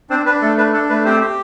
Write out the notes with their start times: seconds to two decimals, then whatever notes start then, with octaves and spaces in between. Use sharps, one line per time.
0.10 C4 D4 C5
0.26 D4 B4
0.42 A3 A4
0.57 D4 B4
0.73 D4 A4
0.89 A3 B4
1.05 C4 G4 C5
1.20 G4